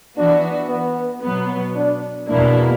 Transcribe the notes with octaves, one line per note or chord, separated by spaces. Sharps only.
E3 B3 D4 F#4
B3
B2 F#3 B3
D4
E2 B2 A#3 D4 E4